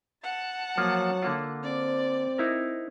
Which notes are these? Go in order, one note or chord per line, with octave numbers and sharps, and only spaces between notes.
F#5 A5
F3 F#3 A#3 F4
D3 A#3 F4
C4 D5
D#4 E4 A#4